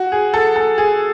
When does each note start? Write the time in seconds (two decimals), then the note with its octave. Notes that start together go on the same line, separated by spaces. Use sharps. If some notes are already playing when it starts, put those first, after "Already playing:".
Already playing: F#4
0.12 G#4
0.34 A4
0.56 A4
0.78 G#4